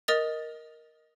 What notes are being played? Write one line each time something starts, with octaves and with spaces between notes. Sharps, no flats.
A#4 D#5 D#6 A6 F7